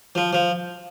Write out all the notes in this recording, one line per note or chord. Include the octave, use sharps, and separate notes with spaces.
F3
F3